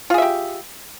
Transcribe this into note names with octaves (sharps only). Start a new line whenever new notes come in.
F4 G4 G#4 E5